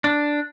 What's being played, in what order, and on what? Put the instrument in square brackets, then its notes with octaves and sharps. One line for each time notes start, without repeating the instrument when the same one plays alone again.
[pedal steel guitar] D4